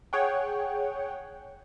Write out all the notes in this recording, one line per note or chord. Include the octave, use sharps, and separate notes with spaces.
G#4 C#5 F#5 G5